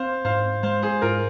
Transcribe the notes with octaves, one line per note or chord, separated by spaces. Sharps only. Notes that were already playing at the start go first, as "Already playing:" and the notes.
Already playing: C4 C5 F5
G#2 C5 F5
G#3 C5 F5
G#4 C5
G#2 F4 A#4